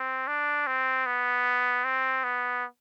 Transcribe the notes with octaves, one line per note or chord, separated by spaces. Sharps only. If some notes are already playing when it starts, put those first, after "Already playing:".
Already playing: C4
D4
C4
B3
C4
B3